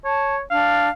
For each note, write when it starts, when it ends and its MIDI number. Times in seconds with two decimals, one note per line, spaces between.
0.05 0.42 73
0.05 0.35 81
0.51 0.89 62
0.51 0.90 77